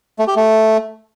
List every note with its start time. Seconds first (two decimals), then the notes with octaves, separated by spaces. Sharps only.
0.19 A3
0.28 G4
0.36 A3